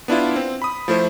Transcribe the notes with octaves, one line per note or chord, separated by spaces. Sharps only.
B3 D4 E4 F4
C4
B5 D#6
F3 A3 E4 C5